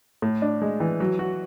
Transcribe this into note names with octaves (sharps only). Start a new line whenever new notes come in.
A2
D4
G#3
E3
F#3
F#4